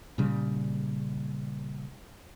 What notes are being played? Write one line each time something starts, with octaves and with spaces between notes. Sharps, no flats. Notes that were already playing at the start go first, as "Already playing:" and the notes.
A#2 C#3 G3